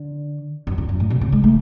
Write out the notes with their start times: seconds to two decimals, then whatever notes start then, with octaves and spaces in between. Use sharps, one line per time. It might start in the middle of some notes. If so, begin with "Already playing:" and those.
Already playing: D3
0.67 F#2
0.78 E2
0.89 F#2
1.00 A2
1.10 B2
1.21 C#3
1.32 G#3
1.44 A3